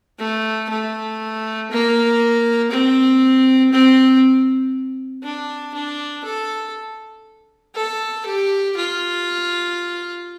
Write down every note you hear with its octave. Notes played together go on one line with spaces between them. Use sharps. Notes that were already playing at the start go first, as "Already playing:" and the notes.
A3
A3
A#3
C4
C4
D4
D4
A4
A4
G4
F4